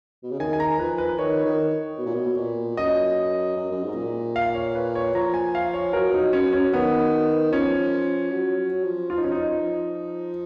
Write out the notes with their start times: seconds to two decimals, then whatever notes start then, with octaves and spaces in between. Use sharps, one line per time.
0.23 B2
0.31 C#3
0.39 D#3 G#5
0.53 G#5
0.60 A#5
0.79 F3 B4
0.98 B4
1.18 D#3 C#5
1.45 D#3
1.98 B2
2.06 A#2
2.14 B2
2.37 A#2
2.77 F#2 D#5
3.56 F#2
3.71 F#2
3.83 G#2
3.95 A#2
4.36 F5
4.55 C#5
4.75 B4
4.95 C#5
5.14 F3 A#5
5.34 G#5
5.55 F5
5.74 C#5
5.93 F#3 A#4
6.14 D#4
6.33 C#4
6.53 C#4
6.73 D#3 B3
7.52 F3 C#4
8.31 F#3
8.57 F#3
8.84 F3
9.10 F3 F4
9.17 D#4
9.24 C#4
9.32 D#4
9.50 F3